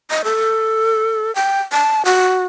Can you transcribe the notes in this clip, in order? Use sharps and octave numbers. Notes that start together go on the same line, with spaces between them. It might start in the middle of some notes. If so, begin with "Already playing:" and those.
D#5
A4
G5
A5
F#4